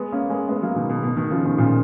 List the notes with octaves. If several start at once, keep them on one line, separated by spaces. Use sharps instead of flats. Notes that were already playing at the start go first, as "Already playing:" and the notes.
Already playing: G#3 B3
A#3 C#4
G#3 B3
G#3 B3
F#3 A#3
B2 D#3
B2
B2
B2 D#3
C#3 F3
B2 D#3
A#2 C#3